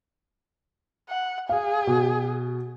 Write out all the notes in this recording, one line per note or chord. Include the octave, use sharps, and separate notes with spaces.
F#5
G#4 F5
B2